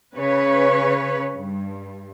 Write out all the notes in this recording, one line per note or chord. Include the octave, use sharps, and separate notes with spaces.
C#3 B4 C#5
G2